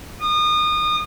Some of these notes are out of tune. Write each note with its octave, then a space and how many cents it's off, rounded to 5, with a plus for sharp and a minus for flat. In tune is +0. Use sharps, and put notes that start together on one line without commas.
D#6 -30